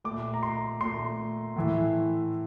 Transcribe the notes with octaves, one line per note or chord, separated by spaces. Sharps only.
A#2 A3 D6
A#5
C6
A#2 A3 C6
A2 E3 A3